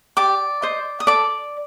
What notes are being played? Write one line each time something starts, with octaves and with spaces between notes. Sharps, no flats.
G4 D5 D6
C5 D#5
D#6
A4 D5 D6